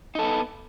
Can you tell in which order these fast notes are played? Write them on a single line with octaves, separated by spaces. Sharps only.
D#4 A4 B3